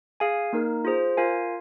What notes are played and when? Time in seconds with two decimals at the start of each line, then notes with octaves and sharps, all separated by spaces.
0.20 G#4 F5 G#5
0.53 A#3 D#4 A#4
0.85 F4 G#4 C5
1.17 F4 A#4 F5 G#5